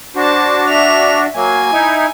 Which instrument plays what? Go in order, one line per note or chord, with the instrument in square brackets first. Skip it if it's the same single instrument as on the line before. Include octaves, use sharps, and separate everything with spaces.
[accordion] D4 F#4 [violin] C5 A5
[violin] E5 F7
[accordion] F#3 A#3 [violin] G#5
[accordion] D#4 E4